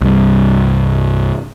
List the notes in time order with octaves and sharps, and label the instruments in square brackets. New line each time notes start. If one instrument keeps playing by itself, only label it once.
[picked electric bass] C2 G2